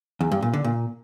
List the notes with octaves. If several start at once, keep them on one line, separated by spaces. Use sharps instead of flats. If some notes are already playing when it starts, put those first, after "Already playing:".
E2
G2
A#2
D3
A#2